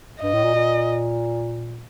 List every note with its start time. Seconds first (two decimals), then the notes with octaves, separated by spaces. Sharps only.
0.22 G2 D#5
0.33 A2
0.44 A#2
0.55 A#2